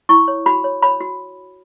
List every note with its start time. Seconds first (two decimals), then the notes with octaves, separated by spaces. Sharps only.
0.09 E4 C#6
0.28 C#5
0.46 F#4 B5
0.64 C#5
0.82 C#5 B5
1.01 F#4